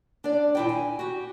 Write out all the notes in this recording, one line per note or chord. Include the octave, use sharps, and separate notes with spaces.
D4 D5
D#2 A#2 E4 D#5 G5
G#5
F#4 G4